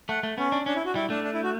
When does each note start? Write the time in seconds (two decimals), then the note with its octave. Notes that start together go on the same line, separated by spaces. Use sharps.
0.09 A3 F#5
0.23 A3
0.38 B3 C#4
0.52 D4
0.66 C#4 D4
0.76 E4
0.85 F#4
0.95 G3 E4
1.10 A3 D4
1.24 D4
1.34 E4
1.44 F#4